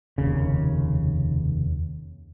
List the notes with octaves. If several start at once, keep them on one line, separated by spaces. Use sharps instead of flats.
F1 D#2 C#3